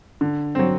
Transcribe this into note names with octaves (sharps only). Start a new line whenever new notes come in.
D3
F#3 C4